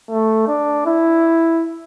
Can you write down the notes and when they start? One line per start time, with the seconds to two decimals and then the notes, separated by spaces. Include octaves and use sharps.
0.10 A3
0.48 D4
0.86 E4